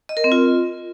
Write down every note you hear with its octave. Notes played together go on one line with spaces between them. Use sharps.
D#5
A#4
C4
F4